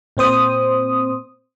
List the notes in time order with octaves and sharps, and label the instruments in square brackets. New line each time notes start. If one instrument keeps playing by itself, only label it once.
[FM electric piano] A#2 C4 C5 D#6